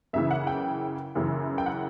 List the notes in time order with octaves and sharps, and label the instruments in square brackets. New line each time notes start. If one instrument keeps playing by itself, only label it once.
[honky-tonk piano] F#2 C#3 E3 E5
F#5
G5
F#2 C#3 E3
G5
F#5